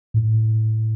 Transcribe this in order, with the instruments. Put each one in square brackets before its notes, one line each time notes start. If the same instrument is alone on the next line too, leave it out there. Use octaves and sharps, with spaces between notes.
[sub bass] A2